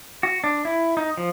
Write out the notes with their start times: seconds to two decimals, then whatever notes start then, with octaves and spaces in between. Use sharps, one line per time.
0.23 F#4
0.44 D4
0.65 E4
0.97 D#4
1.17 F3